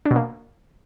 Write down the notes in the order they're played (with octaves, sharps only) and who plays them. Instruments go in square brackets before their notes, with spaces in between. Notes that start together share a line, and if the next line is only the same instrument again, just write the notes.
[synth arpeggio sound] D4
B2
A#3